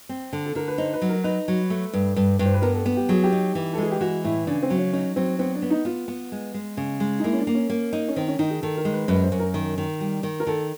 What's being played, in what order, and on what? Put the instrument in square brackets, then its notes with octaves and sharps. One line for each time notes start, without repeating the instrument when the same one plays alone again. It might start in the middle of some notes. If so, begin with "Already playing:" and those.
[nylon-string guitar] C4
D3
[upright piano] A4
[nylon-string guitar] D3 [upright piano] A#4
[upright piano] B4
[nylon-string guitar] D#4 [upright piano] C5
[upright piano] B4
[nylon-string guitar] F#3
[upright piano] A#4
[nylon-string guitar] D#4 [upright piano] B4
[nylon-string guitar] F#3
A3
G2
G2
G2
[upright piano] C5
B4
[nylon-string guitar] B3 [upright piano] A#4
[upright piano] A4
[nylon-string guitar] B3
[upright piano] G4
[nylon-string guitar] F#3 [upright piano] G#4
[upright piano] G4
[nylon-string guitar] D#4
E3
[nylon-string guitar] G#3 [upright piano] A4
[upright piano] G#4
G4
[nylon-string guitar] E3 [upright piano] F#4
[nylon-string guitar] A2 [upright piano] E4
[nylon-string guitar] C#3 [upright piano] D4
[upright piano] C4
[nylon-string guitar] F#3
[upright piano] C#4
[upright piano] C#4 [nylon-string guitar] D#4
[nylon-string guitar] F#3 [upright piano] C4
[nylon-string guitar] B3 [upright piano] C4
[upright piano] D4
[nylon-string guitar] B3
[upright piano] D#4
[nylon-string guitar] B3 [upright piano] F4
[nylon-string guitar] B3
G#3
G#3
C#3
G#3
[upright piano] D#4
[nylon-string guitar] A#3 [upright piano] E4
[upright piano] C#4
D4
[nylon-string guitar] A#3
[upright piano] C#4
[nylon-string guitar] A#3
D#4
[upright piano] C#4
[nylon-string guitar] D#3 [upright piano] C4
[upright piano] C#4
[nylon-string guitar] D#3 [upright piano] D#4
[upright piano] G#4
[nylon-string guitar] D#3 [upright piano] A4
[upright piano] A#4
[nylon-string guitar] G#3
[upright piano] B4
[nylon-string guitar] F#2 [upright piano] B4
[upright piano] C5
[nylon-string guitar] F#2
[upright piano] A#4
[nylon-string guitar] D#3
D#3
G3
D#3
[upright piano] A#4
[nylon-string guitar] D#3 [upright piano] A4